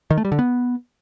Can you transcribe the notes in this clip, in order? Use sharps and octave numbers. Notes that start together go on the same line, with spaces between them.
D#3
A3
G3
D3
B3